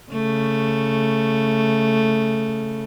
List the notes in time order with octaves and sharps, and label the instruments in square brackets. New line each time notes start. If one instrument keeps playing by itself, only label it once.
[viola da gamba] C#3 A3